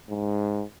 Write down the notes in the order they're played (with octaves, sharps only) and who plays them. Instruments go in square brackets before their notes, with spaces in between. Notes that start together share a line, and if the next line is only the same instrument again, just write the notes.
[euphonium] G#2